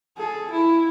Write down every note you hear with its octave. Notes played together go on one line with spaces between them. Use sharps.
G#4 A4
E4